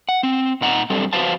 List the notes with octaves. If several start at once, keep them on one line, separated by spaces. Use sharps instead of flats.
F#5
C4
A#2 D#4 F#5 A5 A#5
F#2 G3 C4 D4 A4
F2 F#4 B4 C5 F5 A5